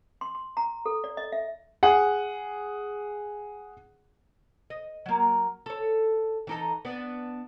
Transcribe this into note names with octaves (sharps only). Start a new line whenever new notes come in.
C6
C6
A#5
A4
D5
D#5
E5
G#4 F#5
D#5
F#3 A#3
A4 C#5
E3 D#4 A4
B3 D4